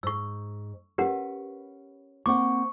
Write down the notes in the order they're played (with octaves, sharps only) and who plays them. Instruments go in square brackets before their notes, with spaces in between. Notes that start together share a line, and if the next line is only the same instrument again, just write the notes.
[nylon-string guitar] G#2 [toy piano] C#6 E6
[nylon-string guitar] C#4 B4 [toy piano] G4 A#4 F#5
[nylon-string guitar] A#3 C4 F#5 [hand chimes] C#6 [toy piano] D6